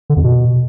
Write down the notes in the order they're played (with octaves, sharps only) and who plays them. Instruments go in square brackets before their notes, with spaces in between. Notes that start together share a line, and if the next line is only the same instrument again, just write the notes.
[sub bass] D3
F2
B2